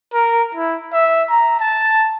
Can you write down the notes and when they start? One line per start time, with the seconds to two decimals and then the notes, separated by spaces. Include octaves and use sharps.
0.13 A#4
0.55 E4
0.93 E5
1.30 A#5
1.60 A5